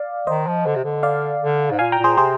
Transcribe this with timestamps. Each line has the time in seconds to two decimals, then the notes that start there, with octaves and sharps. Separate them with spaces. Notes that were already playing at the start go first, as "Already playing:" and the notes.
Already playing: D5 F5
0.27 D#3 C5 D#5
0.47 F3
0.66 D3
0.75 C3
0.84 D3
1.03 D5 F5
1.42 D3
1.71 G#2
1.79 A#2 F5 G#5
1.92 G5 A#5
1.98 A#2
2.04 G#4 C5
2.17 C3 G#4 C5